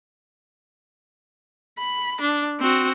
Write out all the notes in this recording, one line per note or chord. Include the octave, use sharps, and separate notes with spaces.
B5
D4
C4 F#4